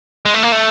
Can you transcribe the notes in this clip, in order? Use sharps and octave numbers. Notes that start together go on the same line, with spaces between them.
G#3
A3
A#3
A3